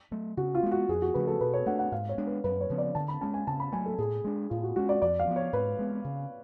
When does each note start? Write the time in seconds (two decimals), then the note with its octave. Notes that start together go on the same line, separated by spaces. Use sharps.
0.11 F#3 A3
0.37 C#3 F#4
0.55 F4
0.63 G#3 B3
0.71 F#4
0.88 F2 G#4
1.02 F#4
1.14 C#3 F3 A3 B4
1.27 A4
1.40 B2 B4
1.54 C#5
1.66 A3 D4 F#5
1.79 F#5
1.92 G#2 F5
2.09 C#5
2.18 G#3 B3 D4
2.27 B4
2.44 F#2 B4
2.61 C#5
2.70 C#3 F3 B3
2.78 D5
2.95 D3 A5
3.08 B5
3.21 G#3 C#4 A5
3.34 G#5
3.47 C#3 A5
3.60 B5
3.72 F#3 A3 G#5
3.86 A4
3.98 A2 G#4
4.24 G#3 D4
4.50 A2 F4
4.63 F#4
4.76 G#3 C#4 F#4
4.89 D5
5.02 F2 D5
5.19 F5
5.27 F3 B3
5.36 C#5
5.53 G#2 B4
5.79 G#3 B3
6.04 C#3